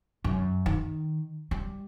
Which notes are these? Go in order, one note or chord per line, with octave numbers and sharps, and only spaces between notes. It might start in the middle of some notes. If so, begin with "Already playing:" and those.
F#2
D#3
G3